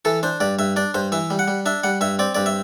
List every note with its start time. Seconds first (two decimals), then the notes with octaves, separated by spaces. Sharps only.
0.05 E3 A4
0.23 D4 C5
0.40 G2 D5
0.59 G2 E5
0.76 D4 D5
0.94 G2 C5
1.12 E3 E5
1.30 G3
1.39 F#5
1.48 G3
1.66 D4 E5
1.83 G3 F#5
2.01 G2 E5
2.19 C4 D5
2.35 G2 D5
2.46 E5